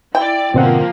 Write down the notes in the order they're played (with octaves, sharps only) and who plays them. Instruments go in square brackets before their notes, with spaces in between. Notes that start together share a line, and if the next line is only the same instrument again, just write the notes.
[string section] E4 D5 [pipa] G5
[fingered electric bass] G#2 D3 [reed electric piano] B2 C4 F#5 [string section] F3 A#3